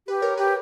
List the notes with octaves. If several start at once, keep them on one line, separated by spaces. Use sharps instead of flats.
G4 B4
A#4 C#5
G4 B4